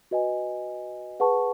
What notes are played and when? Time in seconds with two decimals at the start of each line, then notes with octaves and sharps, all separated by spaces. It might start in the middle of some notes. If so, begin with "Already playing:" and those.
0.11 F#4 B4 D#5 G#5
1.20 G#4 B4 F#5 A5 C#6